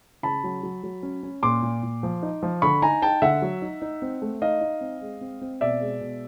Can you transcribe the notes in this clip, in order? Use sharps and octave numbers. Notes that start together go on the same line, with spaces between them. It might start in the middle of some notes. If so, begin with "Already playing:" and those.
C#3 A5 B5
F#3
F#3
F#3
C#4
C#4
A#2 C6 D6
A#2
A#2
F3
D#4
F3
D3 B5 C#6
D#4 G#5 A#5
D#4 G5 A5
D3 E5 F#5
F#3
D#4
D#4
C4
A3
D#4 D#5 F5
D#4
C4
G#3
C4
C4
B2 D5 E5
G#3
B2